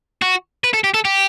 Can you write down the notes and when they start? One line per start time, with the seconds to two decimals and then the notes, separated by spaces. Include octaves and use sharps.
0.22 F#4
0.64 B4
0.74 A4
0.84 G4
0.94 A4
1.05 G4